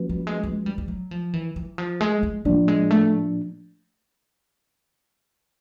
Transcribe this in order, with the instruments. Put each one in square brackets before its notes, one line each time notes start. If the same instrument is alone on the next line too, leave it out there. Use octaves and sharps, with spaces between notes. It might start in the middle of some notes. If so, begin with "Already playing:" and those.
Already playing: [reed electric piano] F3 A#3 C#4 F#4 B4
[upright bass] G3
G#3
G#3
G3
G3
F#3
F3
E3
E3
F3
G#3
G#3
[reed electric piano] A2 F3 A#3 D4 [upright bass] G3
[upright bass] G#3
A3